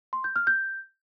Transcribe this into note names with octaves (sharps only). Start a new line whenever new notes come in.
C6
G6
F6
G6